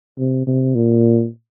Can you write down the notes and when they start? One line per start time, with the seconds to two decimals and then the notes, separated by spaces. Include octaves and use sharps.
0.19 C3
0.47 C3
0.75 A#2